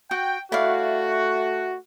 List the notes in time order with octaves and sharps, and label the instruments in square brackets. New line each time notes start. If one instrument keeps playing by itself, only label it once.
[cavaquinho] F#4 [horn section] G5
[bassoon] A3 [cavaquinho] E4 D5 F5 [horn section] F#4